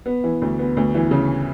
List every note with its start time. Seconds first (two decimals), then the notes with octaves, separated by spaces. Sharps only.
0.06 B3
0.24 E3
0.42 D2
0.59 B3
0.77 D2
0.95 E3
1.11 C#3